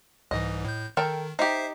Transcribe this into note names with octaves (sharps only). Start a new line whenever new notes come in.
C2 G#2 E3 D#5
A2 G6
D#3 A4 A#4 G5
D#4 G4 C5 E5 C7